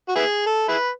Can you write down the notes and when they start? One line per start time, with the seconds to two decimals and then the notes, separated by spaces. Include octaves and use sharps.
0.09 F#4
0.15 B3 E4 G#4
0.46 A4
0.68 E4 G#4 B4